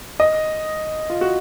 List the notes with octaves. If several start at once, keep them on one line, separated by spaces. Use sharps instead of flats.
D#5
F4
F#4